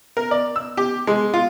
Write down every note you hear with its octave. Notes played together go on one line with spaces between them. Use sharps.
A#4
D5
E6
G4
G#3
F4